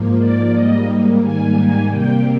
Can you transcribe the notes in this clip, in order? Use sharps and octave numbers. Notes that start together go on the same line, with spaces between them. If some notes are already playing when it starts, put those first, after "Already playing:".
Already playing: G#2 F3 A#3
D5
G#2 G3 A#3 D#5
G#2 D#3 G3 A#3 G#5
C3 G3 A#3 G5